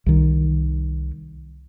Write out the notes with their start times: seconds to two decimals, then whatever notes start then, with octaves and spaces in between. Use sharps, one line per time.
0.06 C2 D#3